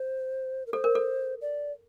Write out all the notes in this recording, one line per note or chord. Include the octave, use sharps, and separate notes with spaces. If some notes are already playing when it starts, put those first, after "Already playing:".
Already playing: C5
A#4
A4 C5
A#4
A4
D5